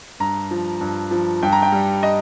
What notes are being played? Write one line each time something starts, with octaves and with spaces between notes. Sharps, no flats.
G2 A#5
F3
G2
F3
G2 G5
A#5
G5
G3
D#5